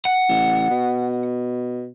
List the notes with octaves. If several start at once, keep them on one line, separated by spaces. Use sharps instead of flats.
F#5
A1
B2